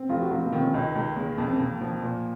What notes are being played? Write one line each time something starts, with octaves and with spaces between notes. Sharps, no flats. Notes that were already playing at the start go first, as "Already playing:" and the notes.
Already playing: C4
F1 F4
F#4
F1 F4
A#3
D#3 C4
C#4
C#2 D#4
C#2
G#3 A#3
F2 A#3
C4
F2 A#3
F3
A#2